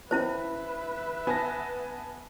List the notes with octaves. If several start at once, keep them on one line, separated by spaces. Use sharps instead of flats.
C#4 E4 B4 C5 E5
B3 G#5 A5 A#6